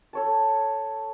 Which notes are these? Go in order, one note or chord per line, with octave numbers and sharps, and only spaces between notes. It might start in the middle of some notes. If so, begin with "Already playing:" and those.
A4 C#5 A5